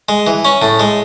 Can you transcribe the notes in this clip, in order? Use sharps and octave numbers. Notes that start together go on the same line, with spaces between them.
G#3
E3
C#4
A2
G#3